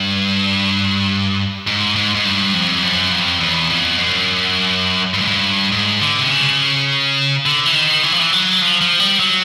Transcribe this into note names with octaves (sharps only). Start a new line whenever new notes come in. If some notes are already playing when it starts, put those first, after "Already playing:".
Already playing: G2
G#2
G#2
G#2
G2
F2
F#2
F2
E2
F2
F#2
G2
G#2
G2
G#2
D3
C3
C#3
D3
E3
D#3
E3
F3
E3
F#3
F3
F3
G3
F#3